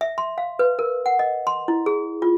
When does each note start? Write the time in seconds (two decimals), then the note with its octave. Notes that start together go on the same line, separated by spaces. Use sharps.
0.01 E5
0.18 C6
0.38 F5
0.59 B4
0.79 A#4
1.06 F#5
1.19 D#5
1.47 C6
1.68 E4
1.86 G#4
2.22 F4